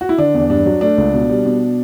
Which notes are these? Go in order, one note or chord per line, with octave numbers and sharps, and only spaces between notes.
F#4
E4
D3 D4
E2
G2 D4
F#3
A3 D4
C#2
B2
G3
B2